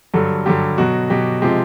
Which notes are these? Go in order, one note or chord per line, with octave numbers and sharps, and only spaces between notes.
G2 D3 F#3 A4
G2 D3 F#3 G4
B2 F#3 F#4
B2 F#3 G4
C3 F3 G#3 G4